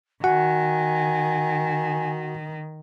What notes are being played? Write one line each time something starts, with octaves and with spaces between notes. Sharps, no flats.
D#3 F#4 F#5 G#5